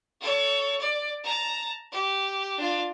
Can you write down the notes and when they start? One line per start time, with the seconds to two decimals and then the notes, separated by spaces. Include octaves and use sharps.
0.21 A4 C#5
0.80 D5
1.24 A5 A#5
1.92 G4
2.57 D4 F4